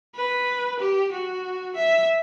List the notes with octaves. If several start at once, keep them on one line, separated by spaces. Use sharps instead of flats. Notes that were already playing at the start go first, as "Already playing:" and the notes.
B4
G4
F#4
E5